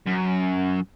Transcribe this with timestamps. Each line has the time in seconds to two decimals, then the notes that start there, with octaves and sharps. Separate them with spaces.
0.06 F#2